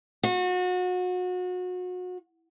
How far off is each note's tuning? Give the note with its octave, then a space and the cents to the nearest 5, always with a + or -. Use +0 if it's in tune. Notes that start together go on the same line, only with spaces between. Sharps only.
F#4 -30